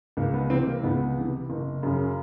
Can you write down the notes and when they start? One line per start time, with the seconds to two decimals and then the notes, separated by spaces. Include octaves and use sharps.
0.17 C#2 A#3
0.34 B3
0.50 C3 E3 C4
0.67 A#3
0.84 C#2 B3
1.17 C3 E3
1.50 F#1
1.83 F#2 C#3